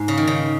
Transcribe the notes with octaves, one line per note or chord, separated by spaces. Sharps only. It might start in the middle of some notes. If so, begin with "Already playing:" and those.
Already playing: G#2
C#3
D#3
C#3